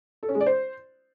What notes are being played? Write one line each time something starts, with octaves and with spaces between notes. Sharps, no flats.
A4
C#4
G#3
D5
C5